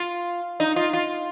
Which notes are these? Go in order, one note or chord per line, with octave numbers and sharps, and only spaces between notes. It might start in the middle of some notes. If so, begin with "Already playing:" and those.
Already playing: F4
D#4
F4
F4